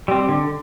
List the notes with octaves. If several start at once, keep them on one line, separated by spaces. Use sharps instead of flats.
G3 C4
D3